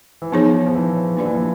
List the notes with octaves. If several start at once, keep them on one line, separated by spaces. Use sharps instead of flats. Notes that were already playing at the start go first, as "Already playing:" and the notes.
E3
F3 B3 D#4 G#4 C#5
F3
E3
F3 A#3 D4 G4 B4 D5
E3
F3